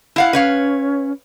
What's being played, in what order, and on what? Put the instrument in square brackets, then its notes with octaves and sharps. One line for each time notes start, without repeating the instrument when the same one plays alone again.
[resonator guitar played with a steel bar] E4 F5 F#5
[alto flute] C#4 [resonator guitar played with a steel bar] B4 C#5 F5